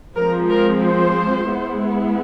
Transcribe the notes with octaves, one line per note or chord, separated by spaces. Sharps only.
F3 G#3 C4 A#4
A#4
C5
G#3 B3 E4